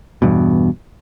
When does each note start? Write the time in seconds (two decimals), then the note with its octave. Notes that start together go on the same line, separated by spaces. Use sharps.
0.22 E2 G2 B2